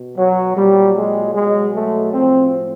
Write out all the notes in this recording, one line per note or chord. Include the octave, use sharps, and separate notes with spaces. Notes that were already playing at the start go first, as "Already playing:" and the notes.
Already playing: B2
F#3
A#2 F#3 G3
G#3
B2 F#3 G#3
A3
A2 F3 C4